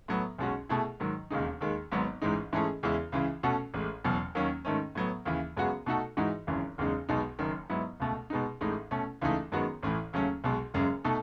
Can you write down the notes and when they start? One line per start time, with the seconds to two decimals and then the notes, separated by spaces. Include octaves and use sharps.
0.08 A2 F#3 B3
0.38 B1 B2 G#3 C#4 F#4
0.69 B2 A3 E4 G#4
1.00 G#2 D#3 F#3
1.30 E1 D#2 C#3 G#3 D#4
1.61 D#2 D#3 G#3
1.92 G#1 G#2 F#3 B3
2.22 A1 G#2 E3 G#3 D#4
2.53 G#2 E3 A3 C#4 G#4
2.83 E2 C#3 G#3 C#4 E4
3.12 C#2 C#3 E3
3.43 B2 A3 C#4 F#4 A4
3.74 A1 A2 G#3
4.04 F#1 E2 B2 F#3
4.35 D#2 D#3 F#3 C#4
4.65 G#2 D#3 A3 C#4
4.95 A2 F#3 B3
5.25 D#2 C#3 E3
5.57 F#2 C#3 G#3 B3 F#4
5.86 B2 A3 D#4 F#4 A4
6.17 G#2 E3 G#3 D#4 F#4
6.47 G#1 F#2 C#3 E3
6.78 F#1 E2 C#3 G#3 D#4
7.09 B1 B2 G#3 B3 D#4
7.39 F#1 F#2 D#3
7.70 G#2 F#3 B3 E4
8.00 C#2 B2 A3
8.30 B2 G#3 B3 D#4
8.61 A1 A2 G#3 D#4
8.91 B2 A3 C#4
9.21 C#2 C#3 E3 A3 D#4
9.52 F#2 D#3 G#3 B3 F#4
9.83 A1 A2 E3
10.13 D#2 C#3 F#3 A3 C#4
10.44 B1 B2 G#3
10.74 F#1 F#2 C#3 G#3
11.04 B2 A3 D#4 A4